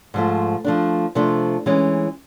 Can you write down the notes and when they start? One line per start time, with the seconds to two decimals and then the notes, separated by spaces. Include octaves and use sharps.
0.14 G#2 F3 A3
0.64 F3 A3 D4
1.15 C3 F3 A3 D4
1.66 E3 G#3 C#4